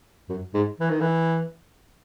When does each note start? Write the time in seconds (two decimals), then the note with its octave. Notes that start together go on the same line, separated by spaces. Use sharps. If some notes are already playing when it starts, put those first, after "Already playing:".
0.29 F#2
0.54 G#2
0.80 E3
0.90 D#3
1.01 E3